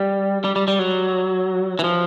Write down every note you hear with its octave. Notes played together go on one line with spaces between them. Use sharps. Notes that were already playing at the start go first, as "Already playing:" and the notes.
Already playing: G3
G3
G3
G3
F#3
E3
F3